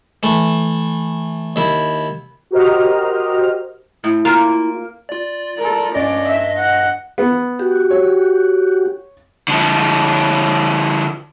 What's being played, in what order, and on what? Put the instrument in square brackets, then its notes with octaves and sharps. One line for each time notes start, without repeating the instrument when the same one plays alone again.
[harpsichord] E3 A3
D#2 E4
[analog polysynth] F#4 G4 A#4 C5 D#5 F6
[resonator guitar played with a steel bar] A2 [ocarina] E4
[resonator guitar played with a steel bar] A#3 A#4 [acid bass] F4
[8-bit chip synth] F4 D5
[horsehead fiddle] A4 A#4
[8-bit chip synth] G2 D#5 A#6 [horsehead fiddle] C#4 D5
[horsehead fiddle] E5
F#5
[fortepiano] B3
[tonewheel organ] F#4 G4
[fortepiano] C#5
[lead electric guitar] D3 F3